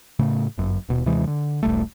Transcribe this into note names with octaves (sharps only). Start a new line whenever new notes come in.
A2 C#3 A3
G1 F#2
D#1 B2
D#2 C3 E3 G#3
D3
E1 B1 G3 A3